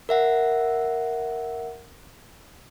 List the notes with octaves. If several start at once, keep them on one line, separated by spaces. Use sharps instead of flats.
A#4 E5 F#5